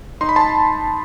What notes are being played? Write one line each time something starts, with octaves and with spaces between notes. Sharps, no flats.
D#4 C6
B5
A5 C6